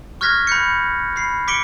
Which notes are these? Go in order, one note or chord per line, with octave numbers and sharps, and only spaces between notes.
C#6 F6 F#6 G#6 A#6 B6
B5 F#6 G6 C#7
B5 C7
D6 B6 C#7 D7 G7